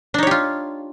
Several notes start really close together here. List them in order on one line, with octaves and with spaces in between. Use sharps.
D4 D#4 C#5 G4 F4